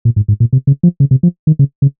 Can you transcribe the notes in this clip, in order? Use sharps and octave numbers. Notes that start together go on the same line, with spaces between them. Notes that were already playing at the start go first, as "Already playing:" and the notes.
A#2
G#2
G#2
A#2
C3
C#3
F3
C#3
C3
F3
D#3
C#3
C#3